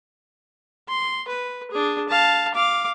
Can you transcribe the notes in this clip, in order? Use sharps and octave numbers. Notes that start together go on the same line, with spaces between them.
C6
B4
D4 G#4
F5 A5
F5 D6